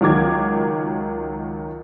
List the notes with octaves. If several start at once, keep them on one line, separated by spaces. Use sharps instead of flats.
C#2 D#3 F#3 D6 G#6